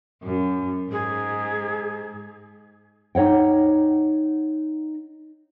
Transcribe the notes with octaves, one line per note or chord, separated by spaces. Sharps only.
F#2
G#2 G#4
D#4 C#5 F#5 G5